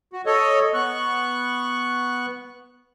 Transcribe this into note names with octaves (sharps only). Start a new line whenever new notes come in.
F#4
A4 C#5 D#5
B3 C#6 F#6